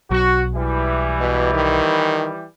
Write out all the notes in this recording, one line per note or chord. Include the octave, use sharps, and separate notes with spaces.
B1 F#3 F#4
E3 G3
B2
D#3